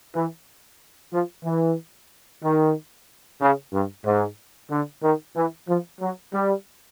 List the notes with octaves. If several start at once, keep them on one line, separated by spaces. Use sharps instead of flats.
E3
F3
E3
D#3
C#3
G2
G#2
D3
D#3
E3
F3
F#3
G3